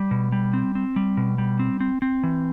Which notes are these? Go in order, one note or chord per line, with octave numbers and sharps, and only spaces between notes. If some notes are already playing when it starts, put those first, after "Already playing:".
Already playing: G3
B2
G3
C4
C4
G3
B2
G3
C4
C4
C4
E3